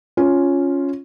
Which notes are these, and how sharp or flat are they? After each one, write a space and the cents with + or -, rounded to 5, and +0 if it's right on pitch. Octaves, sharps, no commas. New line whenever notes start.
C#4 +0 F4 +0